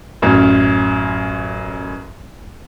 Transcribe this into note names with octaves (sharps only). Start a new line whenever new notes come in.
A1 F#2